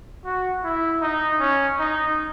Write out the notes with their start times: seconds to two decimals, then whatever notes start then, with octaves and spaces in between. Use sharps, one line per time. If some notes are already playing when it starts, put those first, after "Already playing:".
0.25 F#4
0.64 E4
1.01 D#4
1.40 C#4
1.79 D#4